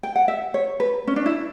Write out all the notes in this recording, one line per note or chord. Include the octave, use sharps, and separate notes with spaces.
G5
F#5
E5
C#5
B4
C#4
D4
E4